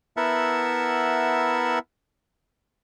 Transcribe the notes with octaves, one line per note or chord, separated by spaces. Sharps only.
B3 E4 A#4 E5 F#5 A5